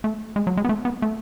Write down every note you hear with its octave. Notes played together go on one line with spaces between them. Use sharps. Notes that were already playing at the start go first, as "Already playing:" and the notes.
A3
G#3
F#3
G#3
B3
A3
B3
A3